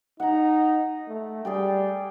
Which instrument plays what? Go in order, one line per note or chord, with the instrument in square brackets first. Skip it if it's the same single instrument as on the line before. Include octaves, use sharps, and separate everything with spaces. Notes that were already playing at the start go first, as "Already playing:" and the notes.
[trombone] D#4 [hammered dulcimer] F#5 A#5
[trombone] A3
[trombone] G3 [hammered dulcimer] G#4 D5 G5